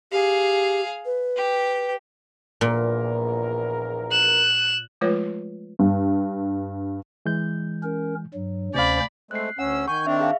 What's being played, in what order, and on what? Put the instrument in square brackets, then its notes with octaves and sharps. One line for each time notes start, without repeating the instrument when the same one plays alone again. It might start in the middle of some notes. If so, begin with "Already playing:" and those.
[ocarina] G4 [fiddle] G#4 F5
[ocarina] B4
[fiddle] G4
[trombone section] A#1 E2 A#4 [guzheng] A#2
[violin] F#6 E7
[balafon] F3 G#3 A3 F4 B4 C#5
[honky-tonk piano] G2
[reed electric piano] E3 G#3 G6
[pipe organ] C#4 A#4
G2 F#3
[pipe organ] D2 C#4 C5 [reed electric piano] C3 F5 [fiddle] D5 B5
[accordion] G#3 A3 C4 [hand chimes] F#6 C7
[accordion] D2 C#4 E6 [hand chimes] F#5
[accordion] D#3 G#5 G6 [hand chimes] C#6
[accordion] D#3 C4 D4 [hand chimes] E5
[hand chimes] G#4 F5